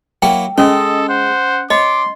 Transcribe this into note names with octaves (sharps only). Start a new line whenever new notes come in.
F#3 A#3 E4 G5
G#3 C#4 A4 D#5
C5 F#5
C#5 D#5 C6 D6